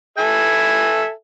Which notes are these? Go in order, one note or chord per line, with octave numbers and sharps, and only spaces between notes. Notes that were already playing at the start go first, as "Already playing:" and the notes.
A4 E5 G#5